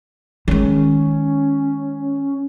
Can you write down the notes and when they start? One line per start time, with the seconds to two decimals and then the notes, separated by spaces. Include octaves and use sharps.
0.48 D#3 G#3 C#4